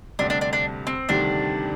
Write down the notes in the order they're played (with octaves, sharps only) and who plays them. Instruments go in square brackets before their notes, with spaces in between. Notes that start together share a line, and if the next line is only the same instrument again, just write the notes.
[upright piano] D2 C3 G3 [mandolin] D4
[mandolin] D4
D4
D4
C4
[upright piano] D2 C3 D#3 G3 [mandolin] D4